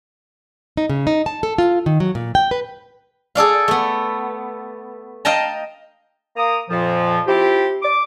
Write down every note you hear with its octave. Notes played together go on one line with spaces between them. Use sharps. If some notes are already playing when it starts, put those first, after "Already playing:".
D#4
C#3
D#4
A5
A4
F4
D#3
F#3
A#2
G5
B4
G#4 A4 D5 F5
A3 B3
D#5 F5 G5 A5 A#5
A#3 A#5 D#6
F2 A#2 F3
C4 E4 F4 G4
D6